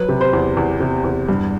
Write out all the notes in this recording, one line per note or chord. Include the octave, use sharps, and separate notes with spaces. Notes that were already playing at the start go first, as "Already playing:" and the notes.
Already playing: F#3 B4
C3
C5
E2
E2
C3
E2
G2